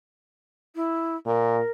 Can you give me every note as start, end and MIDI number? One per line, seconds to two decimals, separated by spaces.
0.76 1.16 64
1.26 1.61 46
1.26 1.71 70